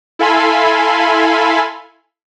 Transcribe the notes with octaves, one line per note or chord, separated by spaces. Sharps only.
E4 A4 F5 G#5 B5 C6